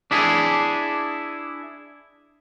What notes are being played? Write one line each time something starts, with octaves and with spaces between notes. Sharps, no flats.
D4 E4 G#4